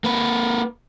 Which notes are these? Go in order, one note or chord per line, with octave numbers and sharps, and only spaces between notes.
A#3 B4